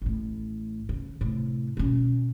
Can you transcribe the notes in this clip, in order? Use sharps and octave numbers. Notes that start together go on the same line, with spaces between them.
A1 A2
C#3
A2 C3
B2 C#4